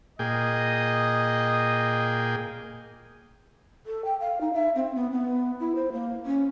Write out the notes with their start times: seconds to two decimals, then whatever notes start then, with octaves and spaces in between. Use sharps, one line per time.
0.19 A#2 G#4 D#5 G5
3.86 A4
4.05 G5
4.20 F5
4.41 D#4
4.53 E5
4.75 C4
4.95 B3
5.11 B3
5.60 E4
5.75 C5
5.93 A#3
6.26 C#4